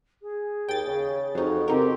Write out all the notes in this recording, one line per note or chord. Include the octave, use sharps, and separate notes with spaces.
G#4
D#2 G5 A6
C#3
F2 F3 D#4 F#4
C#3 C4 D#4 G4 A#4